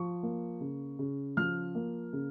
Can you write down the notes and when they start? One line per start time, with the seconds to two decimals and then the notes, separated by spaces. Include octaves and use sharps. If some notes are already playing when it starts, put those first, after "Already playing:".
Already playing: F3 C#6
0.23 A#3
0.61 C#3
0.99 C#3
1.37 F3 F6
1.75 A#3
2.13 C#3